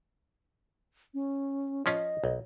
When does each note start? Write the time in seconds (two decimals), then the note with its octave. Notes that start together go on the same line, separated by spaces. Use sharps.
1.14 C#4
1.86 F3 C#4 F4 D#5
2.24 B1